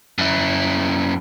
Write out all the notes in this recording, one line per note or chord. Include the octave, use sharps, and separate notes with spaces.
F#2 E4